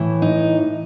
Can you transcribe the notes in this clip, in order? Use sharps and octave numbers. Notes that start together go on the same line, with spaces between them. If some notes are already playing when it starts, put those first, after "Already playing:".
Already playing: A2 E3
D#4